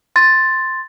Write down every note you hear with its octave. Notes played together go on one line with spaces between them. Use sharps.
C6 A6